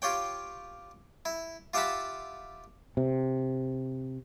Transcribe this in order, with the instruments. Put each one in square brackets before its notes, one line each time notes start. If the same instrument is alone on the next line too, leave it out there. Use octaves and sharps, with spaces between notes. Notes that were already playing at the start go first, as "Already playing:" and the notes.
[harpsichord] F4 G4 C#5 G5
E4
F4 G4 E5 F#5 A5 B5
[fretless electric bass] C3